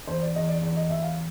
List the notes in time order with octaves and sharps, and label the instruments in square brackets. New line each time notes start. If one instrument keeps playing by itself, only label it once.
[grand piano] E2 C5
D5
E2 D#5
D5
E2 D5
D#5
E2 E5
F5